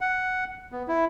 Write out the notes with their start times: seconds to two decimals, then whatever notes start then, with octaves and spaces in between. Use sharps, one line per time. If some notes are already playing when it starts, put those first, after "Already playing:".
0.01 F#5
0.72 B3
0.88 E4